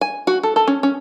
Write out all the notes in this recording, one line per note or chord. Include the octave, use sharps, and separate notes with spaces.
G#5
F#4
A4
A4
C#4
C#4